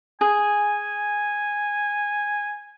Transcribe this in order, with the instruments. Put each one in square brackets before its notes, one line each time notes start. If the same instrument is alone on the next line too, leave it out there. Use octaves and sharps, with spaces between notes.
[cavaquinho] G#4 [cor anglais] G#5